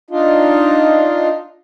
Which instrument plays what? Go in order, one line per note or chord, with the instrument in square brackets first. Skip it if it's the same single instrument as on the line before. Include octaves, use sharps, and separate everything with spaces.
[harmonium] D4 D#4 F4